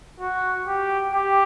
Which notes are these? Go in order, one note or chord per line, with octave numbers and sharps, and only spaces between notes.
F#4
G4
G4